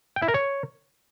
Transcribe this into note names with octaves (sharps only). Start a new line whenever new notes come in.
G5
E4
A#4
C#5